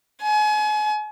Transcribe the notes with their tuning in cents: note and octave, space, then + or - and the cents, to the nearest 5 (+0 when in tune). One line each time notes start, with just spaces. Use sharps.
G#5 +35